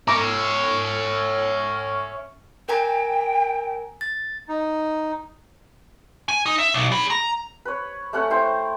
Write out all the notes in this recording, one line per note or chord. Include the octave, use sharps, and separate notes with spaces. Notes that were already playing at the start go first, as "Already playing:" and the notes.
C#4 C#5 E5 A#5 D6
A#4 G5 G#5 A#5
A6
D#4
G#5
D#4
E5
B1
G#4 B5
A#5
B4 C#5
A3 C#4 F#5 C#6
E4 C5 G5